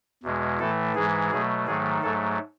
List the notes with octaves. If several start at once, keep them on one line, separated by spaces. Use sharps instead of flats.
E2 B2 G#3
A2 E3 A3 A4
G#2 E3 G#3 G#4
B2 F#3 A3 G#4
G#2 D#3 F#3 A3 G#4
G#2 F#3 A3 A4